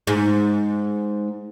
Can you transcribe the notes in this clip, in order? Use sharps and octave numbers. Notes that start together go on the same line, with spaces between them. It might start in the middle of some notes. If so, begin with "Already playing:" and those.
G#2